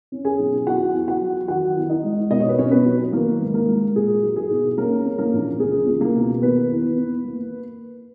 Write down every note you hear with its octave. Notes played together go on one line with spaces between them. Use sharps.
C#4
G#4 G#5
B1
E2 F#4 F#5
E2
F#4 F#5
F#3
D#3 F#4 F#5
E2
D#4 D#5
G#3
B2 D#5
C#5
B4
B1 C#4 C#5
B3 B4
F#3
D#3 A#3 A#4
G#2
A#3 A#4
G#3
A#2 G#4
F#3
G#4
B1
A#3 C#4 A#4
C#4
A#3 A#4
A#1
C#2 G#4
C#2
A#3 A#4
B2
D#3 B3 B4
E2
B3
A#3